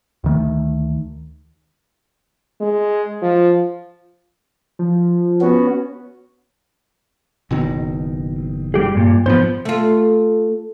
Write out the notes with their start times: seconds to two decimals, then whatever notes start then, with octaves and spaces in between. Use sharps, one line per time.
0.24 D2 D#3 A3
2.61 G#3
3.22 F3
4.79 F3
5.41 B3 C#4 F#4
7.51 F#1 B2 D#3
8.74 G3 G4 G#4
8.95 G2 A#2
9.26 G#2 F3 B3 C5
9.65 A3 F4